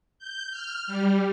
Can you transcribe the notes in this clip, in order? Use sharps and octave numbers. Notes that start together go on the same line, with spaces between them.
G6
F6
G3